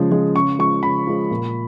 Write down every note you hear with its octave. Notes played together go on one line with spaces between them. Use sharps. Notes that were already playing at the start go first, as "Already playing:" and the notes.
Already playing: C#3 F3 G#3
F3 G#3
C#3 C#6
F3 G#3 C#6
C#3 B5
F3 G#3
A#2